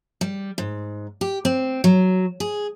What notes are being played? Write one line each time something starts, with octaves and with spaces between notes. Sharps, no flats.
G3
G#2
G4
C4
F#3
G#4